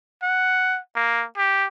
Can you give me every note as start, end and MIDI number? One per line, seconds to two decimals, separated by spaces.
0.23 0.79 78
0.96 1.25 58
1.37 1.68 67